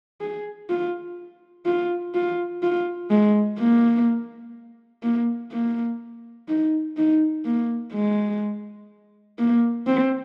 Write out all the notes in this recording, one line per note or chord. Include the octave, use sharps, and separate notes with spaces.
G#4
F4
F4
F4
F4
G#3
A#3
A#3
A#3
D#4
D#4
A#3
G#3
A#3
C4